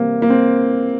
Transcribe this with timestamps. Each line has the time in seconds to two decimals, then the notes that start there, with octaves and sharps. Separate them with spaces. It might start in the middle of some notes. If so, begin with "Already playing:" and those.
Already playing: C3 E3 G3 A#3 C4
0.22 A#3
0.30 C4